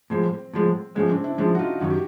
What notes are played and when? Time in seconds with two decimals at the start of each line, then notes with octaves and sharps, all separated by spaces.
0.10 A2 F3 G#3 C4
0.53 A2 F3 G#3
0.95 A2 F3 G#3 B3 C#4
1.09 C4 D4
1.24 D4 E4
1.38 A2 F3 G#3 D4 E4
1.55 F#4
1.59 D#4 F4
1.80 F#2 D#3 F#3 F#4
1.90 G4